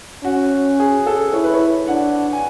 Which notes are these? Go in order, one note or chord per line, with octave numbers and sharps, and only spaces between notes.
C#4 F#4
G#4
A4
E4 C#5
B4
C#5
D4 F#5
G#5